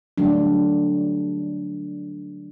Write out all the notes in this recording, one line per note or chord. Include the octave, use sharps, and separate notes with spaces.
D3 F#3 G3 A3 D4